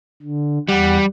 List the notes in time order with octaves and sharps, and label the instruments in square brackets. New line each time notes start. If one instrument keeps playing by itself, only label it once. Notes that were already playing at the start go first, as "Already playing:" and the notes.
[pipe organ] D3
[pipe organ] E2 F#5 [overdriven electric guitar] G3